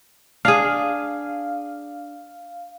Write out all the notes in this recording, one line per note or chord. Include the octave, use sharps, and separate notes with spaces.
D4 G#4 F5